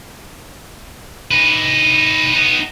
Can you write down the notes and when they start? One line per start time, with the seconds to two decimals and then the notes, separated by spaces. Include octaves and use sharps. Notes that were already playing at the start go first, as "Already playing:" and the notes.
1.31 D#4 B4
2.34 B3 D#4